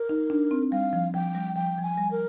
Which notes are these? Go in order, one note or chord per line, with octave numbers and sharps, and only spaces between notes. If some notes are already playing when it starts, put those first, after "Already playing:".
Already playing: A#4
D#4
D4
C4
G3 F5
F3
F3 G5
G3
F3 G5
F3
G#5
G3
A#4